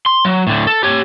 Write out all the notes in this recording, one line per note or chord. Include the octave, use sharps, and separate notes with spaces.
C6
F#3
A2 D3
A4
G4 C#5